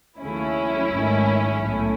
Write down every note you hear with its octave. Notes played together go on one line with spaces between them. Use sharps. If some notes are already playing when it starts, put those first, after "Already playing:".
D#2 C#3 F#3 A3 C#4 E4
G#1 G#2 D#3 F#3 A3
B1 A2 F#3 A3